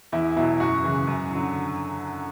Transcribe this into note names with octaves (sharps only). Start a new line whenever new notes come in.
E2 E4
B2 F#3 E4
F#2 F#4
C#3 E3
F#2
D3 F#3